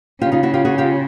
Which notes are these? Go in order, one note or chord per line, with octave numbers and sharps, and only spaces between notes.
C#3 F4 G4
D#4 F4
E4 F#4
F4 G4
F#4 G#4
F4 G4